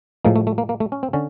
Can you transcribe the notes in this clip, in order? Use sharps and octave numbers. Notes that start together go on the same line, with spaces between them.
A2 F3 G#3 A#3
A3
A3
A#3
A#3
A3
C#4
C4
D3 C#4